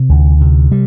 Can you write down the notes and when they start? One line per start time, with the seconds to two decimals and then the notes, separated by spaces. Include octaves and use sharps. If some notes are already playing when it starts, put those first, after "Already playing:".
Already playing: C3
0.09 D2
0.41 C3
0.72 G3